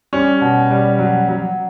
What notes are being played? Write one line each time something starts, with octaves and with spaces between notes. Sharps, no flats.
G3 C#4
B2
G3
F#3
F#3